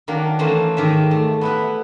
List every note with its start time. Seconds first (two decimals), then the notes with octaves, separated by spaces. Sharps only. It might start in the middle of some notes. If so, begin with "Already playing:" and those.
0.08 D#3 F#3 A#3 D4
0.39 E3 A3 A#3 C#4 C5
0.77 G#2 D#3 G4 E5
1.11 A3
1.41 B3 E4 B4